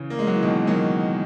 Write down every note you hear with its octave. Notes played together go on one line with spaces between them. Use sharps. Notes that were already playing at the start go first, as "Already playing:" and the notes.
Already playing: C#3 E3
A#3
G#3
F#3
E3
B2 D#3
D#3 F#3